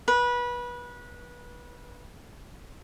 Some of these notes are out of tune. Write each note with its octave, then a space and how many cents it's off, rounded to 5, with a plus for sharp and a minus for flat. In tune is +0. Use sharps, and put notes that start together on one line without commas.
B4 -25